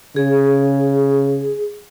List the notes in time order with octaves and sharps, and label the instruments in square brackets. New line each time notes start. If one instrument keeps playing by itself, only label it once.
[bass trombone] C#3 [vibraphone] G#4